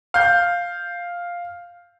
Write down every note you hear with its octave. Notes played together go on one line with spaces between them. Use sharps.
F5 G6